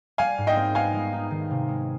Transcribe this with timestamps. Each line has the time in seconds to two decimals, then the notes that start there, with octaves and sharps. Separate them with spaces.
0.18 G3 F5 G#5
0.38 G#2
0.47 D#5 G5
0.56 C4
0.75 B3 F5 G#5
0.93 G#3
1.13 D#4
1.31 D#3
1.51 C3
1.68 G#3